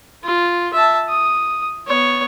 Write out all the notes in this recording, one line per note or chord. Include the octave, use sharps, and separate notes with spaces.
F4
E5 A5
D#6
B3 C#5